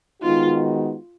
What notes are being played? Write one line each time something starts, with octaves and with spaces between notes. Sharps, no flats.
D#3 G#3 B3 D#4 F4 F#4